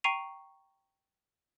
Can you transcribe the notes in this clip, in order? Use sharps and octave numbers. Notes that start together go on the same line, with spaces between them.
G5 A#5 C#6 C7 D#7 F7